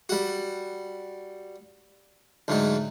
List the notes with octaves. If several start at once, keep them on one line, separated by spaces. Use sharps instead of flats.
G3 F#4
D2 G#2 F#3